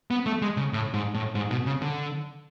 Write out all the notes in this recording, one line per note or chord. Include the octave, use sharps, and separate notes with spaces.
B3
A3
G#3
C#3
A2
G#2
A2
G#2
B2
C#3
D3